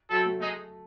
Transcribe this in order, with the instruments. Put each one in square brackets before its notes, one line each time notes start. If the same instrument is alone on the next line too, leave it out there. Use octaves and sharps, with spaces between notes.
[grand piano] F#3 [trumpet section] C4 E4 A4
[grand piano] A3
[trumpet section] G#3 D#4 G#4 D#5 [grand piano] A3